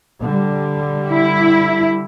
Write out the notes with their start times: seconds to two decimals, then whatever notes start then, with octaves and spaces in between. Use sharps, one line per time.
0.19 D3 G3
1.09 E4